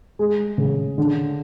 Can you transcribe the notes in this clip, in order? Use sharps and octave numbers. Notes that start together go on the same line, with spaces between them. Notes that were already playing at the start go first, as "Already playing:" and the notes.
G#3
C#3
D3